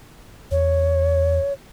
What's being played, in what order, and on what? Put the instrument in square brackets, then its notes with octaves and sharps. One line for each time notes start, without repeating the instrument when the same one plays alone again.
[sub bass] E2 [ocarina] C#5